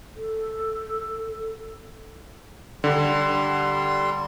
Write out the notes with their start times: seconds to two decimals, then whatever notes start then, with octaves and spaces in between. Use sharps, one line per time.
0.16 A4
2.84 D3 G3 C6